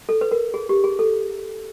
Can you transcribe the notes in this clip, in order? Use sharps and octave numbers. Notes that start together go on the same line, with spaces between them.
A4
B4
A#4
G#4
G4
G#4
A4